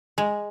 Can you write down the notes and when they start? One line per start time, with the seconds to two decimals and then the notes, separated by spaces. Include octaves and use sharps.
0.18 G#3